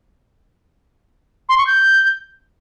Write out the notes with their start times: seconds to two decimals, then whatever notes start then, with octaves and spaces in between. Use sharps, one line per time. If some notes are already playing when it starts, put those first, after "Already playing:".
1.49 C6
1.58 C#6
1.67 G6